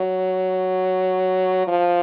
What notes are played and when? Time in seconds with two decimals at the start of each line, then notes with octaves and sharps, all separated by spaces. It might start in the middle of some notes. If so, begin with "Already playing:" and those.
Already playing: F#3
1.67 F3